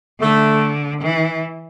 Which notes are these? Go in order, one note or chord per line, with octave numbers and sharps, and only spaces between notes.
D3 A3
E3